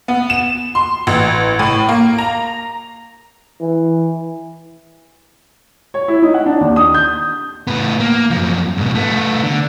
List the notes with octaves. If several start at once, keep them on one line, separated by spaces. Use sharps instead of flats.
B3
E7
C6
A1
A2
A#3
A#5
E3
C#5
E4
D#4
F#5
D4
D#2
D#6
G6
A2 B3
A#3
F#2 F3
G#2 B2
A3 B3
D3